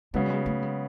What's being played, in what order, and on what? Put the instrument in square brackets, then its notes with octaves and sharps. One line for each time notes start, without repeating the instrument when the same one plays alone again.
[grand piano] C#3 F#3 B3 [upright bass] G#3
[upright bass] G3
G#3
A3
G#3